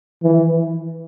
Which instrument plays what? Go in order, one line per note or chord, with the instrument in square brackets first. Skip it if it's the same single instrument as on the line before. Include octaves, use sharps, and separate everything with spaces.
[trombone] E3